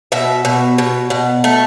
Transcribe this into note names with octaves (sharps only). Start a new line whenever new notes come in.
B2 E5
B2
B2
B2
A3